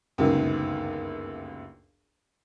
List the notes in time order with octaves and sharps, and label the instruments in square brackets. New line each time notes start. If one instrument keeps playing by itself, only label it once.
[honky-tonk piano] G1 C#2 F#2 A#2 D#3